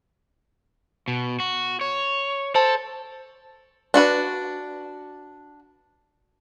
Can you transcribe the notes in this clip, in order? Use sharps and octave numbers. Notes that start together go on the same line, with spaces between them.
B2
F#4
C#5
A4 C5 A5
D4 F#4 B4